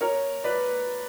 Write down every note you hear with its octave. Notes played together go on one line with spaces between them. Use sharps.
A#4 C#5
B4 D5